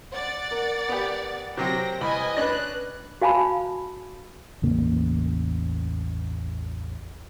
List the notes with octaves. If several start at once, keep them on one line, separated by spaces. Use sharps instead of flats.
D5 F#5 A6
A#4
B3 G4
C3 F#3 C4 G5 A#6
C2 B4 D#5 G#5 B5
C#4 D4 B4 F#6 A#6
F#4 F5 G#5 A5 B5
A1 E2 C#3 A#3